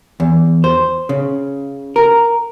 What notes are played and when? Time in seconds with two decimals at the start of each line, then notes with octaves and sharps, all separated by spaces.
0.20 E2
0.64 C5
1.09 C#3
1.96 A#4